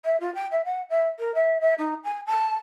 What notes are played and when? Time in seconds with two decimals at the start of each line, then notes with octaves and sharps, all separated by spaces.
0.05 E5
0.20 F4
0.34 G5
0.51 E5
0.64 F#5
0.89 E5
1.19 A#4
1.34 E5
1.61 E5
1.78 D#4
2.04 G#5
2.26 A5